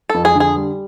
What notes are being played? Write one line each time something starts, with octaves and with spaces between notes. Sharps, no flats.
F2 A4
G#4
D3 G#4
G3